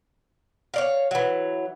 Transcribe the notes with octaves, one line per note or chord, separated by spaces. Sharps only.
C#5 D5 F5
E3 F#3